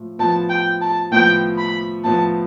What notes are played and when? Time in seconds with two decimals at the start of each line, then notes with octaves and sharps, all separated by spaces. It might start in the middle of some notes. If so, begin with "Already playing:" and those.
Already playing: A2 F3
0.19 A2 F3 B3 A5
0.50 G5
0.81 A5
1.12 A2 F3 B3 G5
1.58 B5
2.04 A2 F3 B3 A5